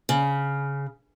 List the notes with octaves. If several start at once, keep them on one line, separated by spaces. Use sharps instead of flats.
C#3